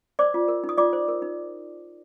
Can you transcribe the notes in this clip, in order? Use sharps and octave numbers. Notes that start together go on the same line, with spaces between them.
C5 D5 D6
F4
A#4
D#4
D#6
F4 D5 D6
C5
A#4
D#4